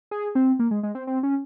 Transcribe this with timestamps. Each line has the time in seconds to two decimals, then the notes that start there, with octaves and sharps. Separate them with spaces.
0.11 G#4
0.35 C4
0.59 A#3
0.71 G#3
0.83 G#3
0.95 C4
1.07 C4
1.23 C#4